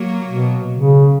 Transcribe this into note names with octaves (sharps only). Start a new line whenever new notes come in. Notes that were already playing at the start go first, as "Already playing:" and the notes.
Already playing: F#3 A#3
B2
C#3